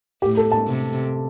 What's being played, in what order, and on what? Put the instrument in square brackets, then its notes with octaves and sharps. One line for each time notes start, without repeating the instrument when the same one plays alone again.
[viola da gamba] A2 [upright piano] G4
[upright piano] A4
A5
[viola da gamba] C3